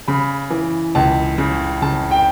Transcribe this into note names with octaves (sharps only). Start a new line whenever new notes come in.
C#3 B5
E3
C#2 A5
C#3
C#3 A5
G5